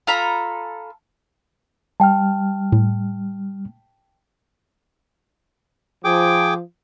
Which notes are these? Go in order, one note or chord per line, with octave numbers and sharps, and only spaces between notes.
F4 A4 A#5 B5
G3 G5 A5 F6
A2
F3 G#4 G5 D6